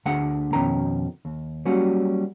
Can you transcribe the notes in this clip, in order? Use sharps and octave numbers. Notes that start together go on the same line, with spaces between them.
D2 D3 A3 G#4 F#5
F2 B2 D#3 C#4 A#4 A#5
D#2
F#3 G3 A#3 C#4 F#4